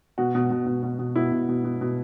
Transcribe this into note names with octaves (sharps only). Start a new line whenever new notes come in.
B2 F#4
B2
B2
B2
B2
B2
B2 E4
B2
B2
B2
B2